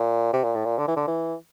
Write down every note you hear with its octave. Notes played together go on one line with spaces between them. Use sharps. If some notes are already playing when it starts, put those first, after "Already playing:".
Already playing: A#2
C3
A#2
A2
A#2
D3
E3
D3
E3